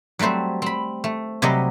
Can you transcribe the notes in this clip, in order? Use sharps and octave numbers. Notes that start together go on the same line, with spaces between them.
F#3 G3 A3 C4 C5
C4 B5
A3
C3 F#3 G3 G4 D#5